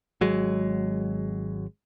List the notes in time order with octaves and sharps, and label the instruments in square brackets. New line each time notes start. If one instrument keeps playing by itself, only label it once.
[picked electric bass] G#1 F#3 G#3